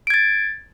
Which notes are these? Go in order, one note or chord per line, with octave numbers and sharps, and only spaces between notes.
G#6 A6 D7